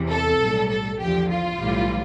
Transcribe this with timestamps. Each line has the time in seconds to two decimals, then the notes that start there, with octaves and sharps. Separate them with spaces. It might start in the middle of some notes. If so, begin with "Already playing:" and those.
Already playing: E2 C3 E3
0.10 A4
0.40 B1 A2 G3
0.70 A4
0.99 E2 D3 F3 G4
1.30 F4
1.59 B1 A2 E3 G3